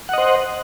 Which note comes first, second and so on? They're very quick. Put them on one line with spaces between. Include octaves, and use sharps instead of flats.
F#5 D#5 C5